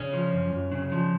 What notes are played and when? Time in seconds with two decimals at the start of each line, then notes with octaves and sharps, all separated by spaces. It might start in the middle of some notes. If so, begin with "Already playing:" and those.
Already playing: C#3 C#4
0.13 F3
0.33 F#2
0.52 F#2
0.72 C#3
0.92 F3